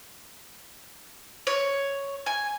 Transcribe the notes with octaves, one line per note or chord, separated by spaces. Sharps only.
C#5
G#5